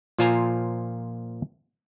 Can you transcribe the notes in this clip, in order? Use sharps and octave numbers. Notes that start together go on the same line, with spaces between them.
A#2 F3 F4 C5 G#5 A#5